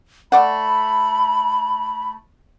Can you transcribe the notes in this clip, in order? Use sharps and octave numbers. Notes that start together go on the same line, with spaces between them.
A3 D5 F#5 B5